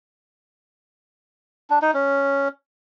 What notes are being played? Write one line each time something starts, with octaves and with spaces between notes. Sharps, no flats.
D4
D#4
C#4